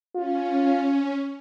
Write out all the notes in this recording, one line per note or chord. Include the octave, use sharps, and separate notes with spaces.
C#4 F4